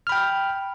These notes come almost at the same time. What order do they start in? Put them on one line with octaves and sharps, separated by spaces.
F6 B5 G5